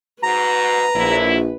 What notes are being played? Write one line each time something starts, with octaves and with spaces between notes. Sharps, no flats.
G#2 F#4 B4 A#5
A#1 D3 F#3 E4